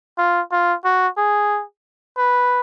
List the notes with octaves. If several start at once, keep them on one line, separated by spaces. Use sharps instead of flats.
F4
F4
F#4
G#4
B4